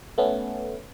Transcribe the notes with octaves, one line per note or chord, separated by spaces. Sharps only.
A3 B3 C#4